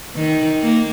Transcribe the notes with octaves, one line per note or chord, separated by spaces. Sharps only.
D#3
A#3